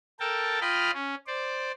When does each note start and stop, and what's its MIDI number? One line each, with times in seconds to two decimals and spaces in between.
0.20 0.60 69
0.20 0.60 70
0.20 0.60 79
0.20 0.60 81
0.61 0.91 65
0.61 0.91 75
0.61 0.91 79
0.61 0.91 83
0.61 0.91 89
0.94 1.15 61
1.27 1.72 72
1.27 1.72 74